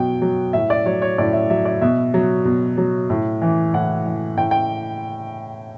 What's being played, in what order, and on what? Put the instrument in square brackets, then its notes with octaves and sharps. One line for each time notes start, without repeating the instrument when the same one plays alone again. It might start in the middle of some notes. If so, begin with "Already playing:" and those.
Already playing: [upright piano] B2 F#3 G5
F#3
A2 E5
D5
F#3 C#5
C#5
A2 D5
E5
F#3 E5
D5
B2 E5
F#3
B2
F#3
A2
E3
A2 F#5
E3
A2 G5
G5